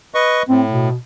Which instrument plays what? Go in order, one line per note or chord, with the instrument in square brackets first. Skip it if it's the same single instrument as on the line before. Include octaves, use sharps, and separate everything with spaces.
[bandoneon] B4 D#5 C#6
[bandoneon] A2 [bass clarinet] C4
[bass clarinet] B2